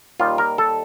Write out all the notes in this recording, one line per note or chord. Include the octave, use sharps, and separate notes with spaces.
D#2 D#3 G3 F4
A#4
A4